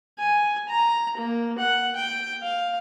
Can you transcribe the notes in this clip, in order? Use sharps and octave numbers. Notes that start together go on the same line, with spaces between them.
G#5
A#5
A#3
F#5
G5
F5